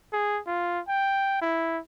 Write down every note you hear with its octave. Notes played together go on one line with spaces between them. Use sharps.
G#4
F4
G5
E4